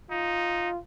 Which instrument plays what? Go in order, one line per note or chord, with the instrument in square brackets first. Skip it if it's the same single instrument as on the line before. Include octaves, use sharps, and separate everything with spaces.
[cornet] D#4 [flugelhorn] F4